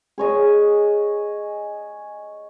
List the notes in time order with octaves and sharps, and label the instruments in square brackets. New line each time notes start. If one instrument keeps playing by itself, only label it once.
[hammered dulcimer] G#4 C#5 D#5